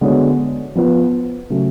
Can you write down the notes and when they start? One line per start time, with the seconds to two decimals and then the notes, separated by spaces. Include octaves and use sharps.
0.01 D3 G#3 B3 F#4 C#5
0.75 F3 B3 F4 B4
1.50 C#3 F#3 A3 C#4